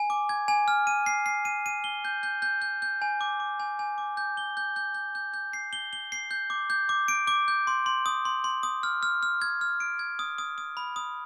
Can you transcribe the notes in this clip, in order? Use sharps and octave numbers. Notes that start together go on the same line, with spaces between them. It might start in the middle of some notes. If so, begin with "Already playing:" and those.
Already playing: G#5
D6
G#6
G#5
F6
D#7
C7
C7
D#7
D#7
G7
G6
G6
G6
G6
G6
G#5
D6
D6
G#5
G#5
D6
G6
G7
G6
G6
G6
G6
G6
C7
G7
G7
C7
G6
D6
G6
D6
D7
D6
G6
C6
C6
D#6
C6
C6
D#6
F6
F6
F6
G#6
F6
D7
G#6
D#6
D#6
D#6
B5
D#6